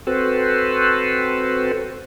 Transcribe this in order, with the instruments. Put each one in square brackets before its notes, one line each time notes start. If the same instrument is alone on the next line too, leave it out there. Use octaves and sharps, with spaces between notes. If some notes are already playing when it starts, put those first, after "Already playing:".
[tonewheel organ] C4 F#4 A4 B4 C5